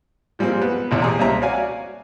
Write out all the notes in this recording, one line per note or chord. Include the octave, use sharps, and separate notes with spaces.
F3 G3 G#3 A#3 C4
B3
A1 C3 C#4
G4 G#4 A#5
C2 A#3 C4 C#4 E5 A#5
F#4 C#5 D5 F5 G#5